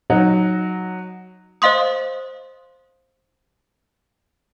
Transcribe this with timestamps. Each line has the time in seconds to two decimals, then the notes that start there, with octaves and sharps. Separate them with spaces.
0.10 F#3 D#4
1.62 C5 D#5 F5 C6 D#6